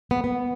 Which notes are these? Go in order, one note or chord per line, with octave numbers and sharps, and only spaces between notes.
B3
B3